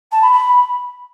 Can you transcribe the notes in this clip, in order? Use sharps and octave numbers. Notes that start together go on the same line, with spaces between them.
A5
B5
B5